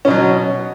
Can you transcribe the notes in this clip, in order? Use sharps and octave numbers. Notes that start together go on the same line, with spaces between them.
B2 F#3 C#4